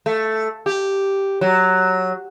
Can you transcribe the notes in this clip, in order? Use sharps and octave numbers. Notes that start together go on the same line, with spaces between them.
A3
G4
F#3